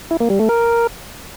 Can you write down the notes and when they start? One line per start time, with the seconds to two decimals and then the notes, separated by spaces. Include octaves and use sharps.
0.11 E4
0.20 A#3
0.30 G3
0.39 A3
0.49 A#4